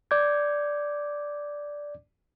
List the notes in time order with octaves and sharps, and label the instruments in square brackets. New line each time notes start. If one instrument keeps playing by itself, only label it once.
[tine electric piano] D5 D6 G6 G#6